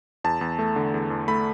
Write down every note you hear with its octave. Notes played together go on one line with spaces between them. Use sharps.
E2 A5
E2
A3
D3
E2
E2
A3 B5